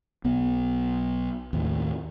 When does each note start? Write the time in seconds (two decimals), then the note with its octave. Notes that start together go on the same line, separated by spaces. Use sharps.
0.24 B1 B3
1.53 D#2 A2 D#3